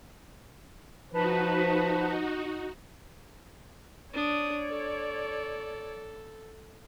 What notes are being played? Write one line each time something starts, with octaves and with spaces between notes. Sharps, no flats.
F3 D#4 F#4 B4 C5 A5
D4 C#5 D5 D#6
A4